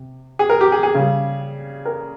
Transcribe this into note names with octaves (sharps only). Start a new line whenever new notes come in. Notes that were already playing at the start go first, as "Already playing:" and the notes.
Already playing: C3
G#4
A#4
G4
G#4
G#4
C#3 G3
A#4